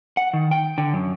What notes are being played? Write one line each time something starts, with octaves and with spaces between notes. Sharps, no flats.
F#5
D#3
G5
D3
F#2